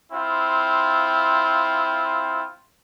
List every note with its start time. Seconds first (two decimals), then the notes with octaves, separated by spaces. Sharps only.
0.12 C4 E4 F4